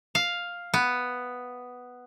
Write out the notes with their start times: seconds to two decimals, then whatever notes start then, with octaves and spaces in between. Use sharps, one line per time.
0.15 F5
0.74 B3